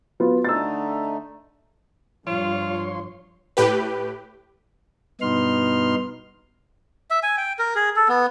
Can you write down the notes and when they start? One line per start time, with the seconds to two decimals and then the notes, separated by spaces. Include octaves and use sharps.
0.20 F#3 B3 F4
0.44 D3 A3 D#4 E6 A6
2.27 G2 F3 F4 C#5 C6
3.57 A2 G4 B4
5.21 G2 B2 B3 D#4 C6 F6
7.11 E5
7.23 G#5
7.37 G5
7.59 A#4
7.76 G#4
7.96 A4
8.09 B3